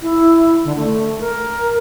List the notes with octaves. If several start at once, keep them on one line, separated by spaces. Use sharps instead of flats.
E4
D3
A3
A#4